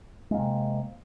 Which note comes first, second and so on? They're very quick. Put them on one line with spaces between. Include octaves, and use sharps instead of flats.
G#3 A#3 C3